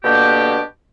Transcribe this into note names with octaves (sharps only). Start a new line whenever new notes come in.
B2 D3 A#3 D4 G4